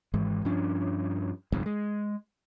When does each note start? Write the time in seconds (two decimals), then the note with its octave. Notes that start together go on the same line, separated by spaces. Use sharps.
0.14 G#1 G#2 E3 G#3
0.45 G2 F3 C#4 D4
1.52 G1 C2 F2 G#2
1.66 G#3